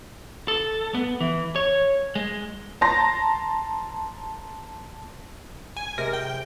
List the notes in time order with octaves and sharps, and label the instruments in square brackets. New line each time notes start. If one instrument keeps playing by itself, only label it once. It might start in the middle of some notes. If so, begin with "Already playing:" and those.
[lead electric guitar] A4
B3
E3
C#5
G#3
[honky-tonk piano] A5 A#5 C6 A#6
[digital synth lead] G#5
[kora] C3 G#3 [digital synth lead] A#4
[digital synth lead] G5